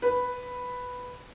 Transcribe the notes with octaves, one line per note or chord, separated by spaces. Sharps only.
B4